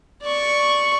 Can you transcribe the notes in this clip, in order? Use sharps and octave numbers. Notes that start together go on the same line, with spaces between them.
D5 C#6